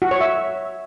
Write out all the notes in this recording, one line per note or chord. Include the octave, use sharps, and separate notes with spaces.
F#4
C#5
E5